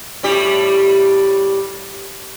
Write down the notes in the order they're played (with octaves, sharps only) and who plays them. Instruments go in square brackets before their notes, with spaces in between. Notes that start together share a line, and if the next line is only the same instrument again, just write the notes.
[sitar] A2 G3 G4